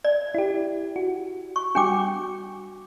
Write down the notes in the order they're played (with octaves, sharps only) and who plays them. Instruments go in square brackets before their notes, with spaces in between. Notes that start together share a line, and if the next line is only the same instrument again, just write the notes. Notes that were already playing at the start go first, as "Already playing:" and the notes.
[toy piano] D5 [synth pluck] G#6
[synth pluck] E4 G4
F#4
[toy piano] C#6
[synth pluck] G3 F#4 [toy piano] D4 G5 D6